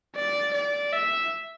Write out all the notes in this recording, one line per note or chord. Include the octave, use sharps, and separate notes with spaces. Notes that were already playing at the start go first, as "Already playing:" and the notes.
D5
D5
E5